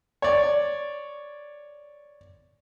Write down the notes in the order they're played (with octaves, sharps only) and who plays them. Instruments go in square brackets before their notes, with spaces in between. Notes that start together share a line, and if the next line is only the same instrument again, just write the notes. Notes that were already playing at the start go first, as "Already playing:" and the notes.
[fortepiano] C#5 D5